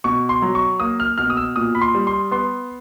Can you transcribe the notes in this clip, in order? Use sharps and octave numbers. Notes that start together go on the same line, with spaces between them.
B2 C#6
C6
F#3
C#6
A#3 D#6
F6
B2 F6
D#6
E6
A#2 D#6
B5
C6
G3
C6
B3 C6